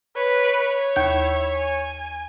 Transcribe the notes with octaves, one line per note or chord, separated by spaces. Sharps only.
B4 C#5
D#2 E4 G6
G#5